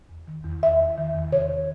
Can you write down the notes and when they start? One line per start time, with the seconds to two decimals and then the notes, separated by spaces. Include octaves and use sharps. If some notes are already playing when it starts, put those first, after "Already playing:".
0.09 E2
0.28 D#3
0.45 E2
0.63 E2 E5
0.80 E2
0.98 D#3
1.15 E2
1.32 C3 C#5
1.50 D#3